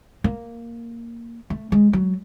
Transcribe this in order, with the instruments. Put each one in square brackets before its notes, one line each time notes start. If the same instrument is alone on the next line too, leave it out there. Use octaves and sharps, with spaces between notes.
[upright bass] A#3
A3
G#3
F#3